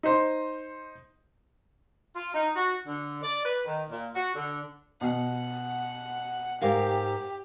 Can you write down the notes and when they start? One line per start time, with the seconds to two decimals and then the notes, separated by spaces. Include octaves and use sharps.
0.03 D#4 C5 C6
2.16 F4
2.34 D#4
2.56 F#4
2.87 D3
3.23 D5
3.44 B4
3.67 D#3
3.90 A#2
4.15 F#4
4.36 D3
5.01 B2 F#5
6.62 G#2 G4 A#4 F5